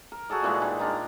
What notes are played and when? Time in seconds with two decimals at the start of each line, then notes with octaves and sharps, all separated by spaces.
0.12 A#4
0.30 F#4 G#4 A4 D#5
0.43 A#2 E3 G3 G#3
0.62 D#3
0.79 D4 F4 D#5 A#5